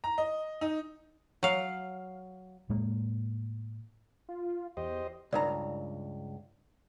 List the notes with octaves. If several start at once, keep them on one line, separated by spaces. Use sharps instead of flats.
A#5
D#5
D#4
F#3 F5
A2 G#3 A#3
F4
E2 G4 C5 D#5
C#2 G2 D#4 A#4 D5 A#5